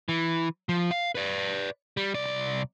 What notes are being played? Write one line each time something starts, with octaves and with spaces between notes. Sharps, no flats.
E3
F3
F5
B4 D5
G3
C2 D5